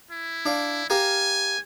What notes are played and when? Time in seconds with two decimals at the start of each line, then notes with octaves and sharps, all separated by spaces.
0.11 E4
0.46 D4 D5 F5
0.90 G4 A#4 F5 G#5